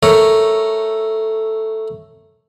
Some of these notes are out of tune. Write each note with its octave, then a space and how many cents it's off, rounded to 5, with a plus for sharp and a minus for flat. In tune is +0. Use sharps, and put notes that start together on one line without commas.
A3 +0 A#4 +0 C#5 +0